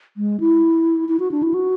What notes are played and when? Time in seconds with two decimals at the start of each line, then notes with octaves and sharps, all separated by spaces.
0.17 G#3
0.40 E4
1.09 E4
1.20 F#4
1.31 D4
1.43 E4
1.54 F#4